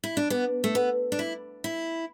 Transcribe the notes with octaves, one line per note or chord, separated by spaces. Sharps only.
E4
D4
B3
A3
B3
D4
E4
E4